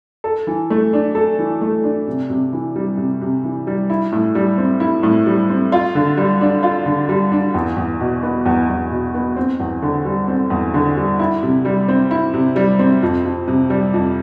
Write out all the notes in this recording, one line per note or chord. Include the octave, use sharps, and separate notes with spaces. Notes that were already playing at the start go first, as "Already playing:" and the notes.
A4
E3
A3
D4
A4
E3
A3
D4
C3
C3
E3
G3
C3
C3
E3
G3
E4
A2
G3
C4
E4
A2
G3
C4
F4
D3
G3
D4
F4
D3
G3
D4
E2
E2
B2
B3
E2
E2
B2
B3
C4
E2
D3
G3
C4
E2
D3
G3
E4
C3
G3
C4
E4
C3
G3
C4
F2
F2
C3
G3
F2